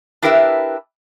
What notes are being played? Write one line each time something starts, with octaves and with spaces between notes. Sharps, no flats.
D4 E4 G4 A#4 B4 E5